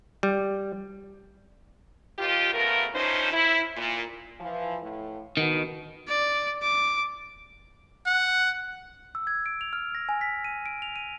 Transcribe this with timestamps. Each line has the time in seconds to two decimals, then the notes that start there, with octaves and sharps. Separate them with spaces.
0.23 G3
2.18 D#2 F4 G4
2.53 C#3 A3 B3 F4 A#4
2.93 E3 F3 C#4 D#4 C5
3.32 E4
3.76 A#2
4.40 E3 F3
4.81 A2
5.37 B2 D#3
6.09 D5
6.63 D6
8.06 F#5
9.15 E6
9.27 G#6
9.46 D7
9.61 F7
9.73 F6
9.95 A#6
10.09 G#5
10.21 B6
10.45 D#7
10.66 D7
10.82 F7
10.96 D#7